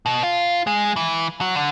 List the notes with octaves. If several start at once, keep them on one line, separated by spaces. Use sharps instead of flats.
B2
F4
G#3
E3
F#3
D3